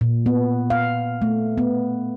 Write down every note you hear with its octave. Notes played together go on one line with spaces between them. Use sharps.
A#2
B3
F5
A3
B3